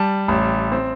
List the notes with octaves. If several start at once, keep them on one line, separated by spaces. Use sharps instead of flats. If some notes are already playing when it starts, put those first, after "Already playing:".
Already playing: G3 A5
A1
C4